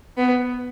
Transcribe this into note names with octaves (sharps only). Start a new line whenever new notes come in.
B3